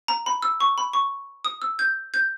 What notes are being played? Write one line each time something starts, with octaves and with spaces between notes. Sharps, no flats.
A#5
B5
E6
C#6
B5
C#6
D#6
E6
G6
G6